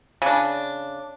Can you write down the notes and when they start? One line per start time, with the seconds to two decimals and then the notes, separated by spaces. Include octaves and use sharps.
0.22 C#3 D4